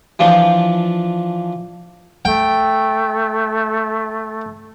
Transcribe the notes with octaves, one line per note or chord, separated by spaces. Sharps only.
E3 F3 D4 F4
A3 G5